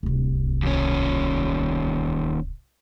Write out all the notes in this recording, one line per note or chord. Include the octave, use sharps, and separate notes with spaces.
D1 C2
D#2 C#4